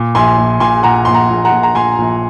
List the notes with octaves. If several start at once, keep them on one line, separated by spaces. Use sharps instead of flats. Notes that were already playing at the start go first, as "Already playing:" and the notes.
Already playing: A#2
A#1 G#5 C6
A#1
A#2 G#5 C6
A#2 F#5 A#5
A#1 C6
F#5 A#5
A#1
F#5 A#5
A#2
A#5
A#2 G#5 C6
A#1